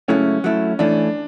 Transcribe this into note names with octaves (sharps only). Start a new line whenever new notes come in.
C#2 C#3 F#3 A3 C#4 E4
F#3 A3 E4
E3 A3 C#4 D4